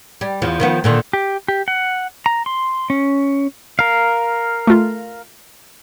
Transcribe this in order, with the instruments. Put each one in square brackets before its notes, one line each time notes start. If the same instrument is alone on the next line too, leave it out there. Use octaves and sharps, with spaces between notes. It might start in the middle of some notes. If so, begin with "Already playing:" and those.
[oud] G3
E2 F3
D#3 F3 B3
A#2 D3 D#3
[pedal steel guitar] G4
G4
F#5
A#5
C6
C#4
A#4 F5
[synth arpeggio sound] A3 F4